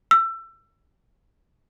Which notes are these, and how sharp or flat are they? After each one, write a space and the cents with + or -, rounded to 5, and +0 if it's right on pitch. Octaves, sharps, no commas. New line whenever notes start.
E6 +25